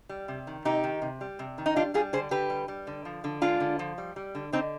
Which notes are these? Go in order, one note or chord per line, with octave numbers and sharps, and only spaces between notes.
G3
C3
D#3
C3 D#4 G4
D#3
C3
G3
C3
D#3
D#4
G3 D4 F4
G3 F4 G#4
D3 G#4 C5
D3 G4 B4
G3
G3
D3
F3
D3
G#3 D4 F4
D3
F3
G3
G3
D3
D3 C4 D#4